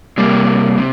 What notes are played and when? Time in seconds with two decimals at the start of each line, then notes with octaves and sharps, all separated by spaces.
0.18 C3 G3 A#3
0.78 C3